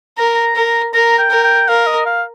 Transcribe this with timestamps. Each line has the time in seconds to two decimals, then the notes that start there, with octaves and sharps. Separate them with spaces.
0.18 A#4 A#5
0.35 A#5
0.56 A#4
0.93 A#4 A#5
1.18 G5
1.30 A#4
1.44 G5
1.68 A#4 F5
1.87 D#5
2.06 F5